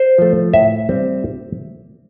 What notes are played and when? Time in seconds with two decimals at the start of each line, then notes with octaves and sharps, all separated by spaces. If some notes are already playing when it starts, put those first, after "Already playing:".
Already playing: C5
0.18 F3 A3
0.53 A2 E5
0.89 G3 C4